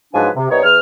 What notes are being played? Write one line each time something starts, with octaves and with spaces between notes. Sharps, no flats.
G#2 F3 F#3 D4 B4 G#5
C3
C2 B3 D#4 C#5
E2 F6